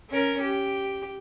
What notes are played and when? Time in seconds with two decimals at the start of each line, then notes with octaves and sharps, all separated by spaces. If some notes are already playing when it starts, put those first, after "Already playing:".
0.10 C#4 A#4
0.42 G4